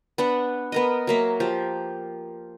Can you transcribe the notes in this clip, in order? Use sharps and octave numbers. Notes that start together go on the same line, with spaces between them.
B3 D4 F#5
B3 A#4 D#5
F#3 A#3 E5
F3 G4